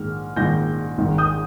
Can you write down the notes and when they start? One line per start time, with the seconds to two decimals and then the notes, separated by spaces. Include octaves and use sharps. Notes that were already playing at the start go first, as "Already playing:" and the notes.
Already playing: A#1 G#2 D#3 F6
0.36 A#1 G#2 D#3 G6 A#6
0.98 G#1 G#2 D#3
1.18 D#6 G6